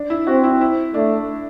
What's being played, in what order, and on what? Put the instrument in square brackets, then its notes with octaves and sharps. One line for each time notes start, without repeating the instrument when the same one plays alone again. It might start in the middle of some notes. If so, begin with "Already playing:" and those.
Already playing: [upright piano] D4
E4
[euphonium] C4 [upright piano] F#4
[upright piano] E4
E4
[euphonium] A3 [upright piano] D4